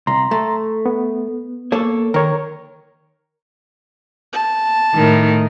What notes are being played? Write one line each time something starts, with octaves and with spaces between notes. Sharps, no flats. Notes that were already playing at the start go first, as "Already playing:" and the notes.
C2 A#5 C6
A3
B3
A#3 A4 C#5
D#3 A#4 C#5
A5
A2 D#3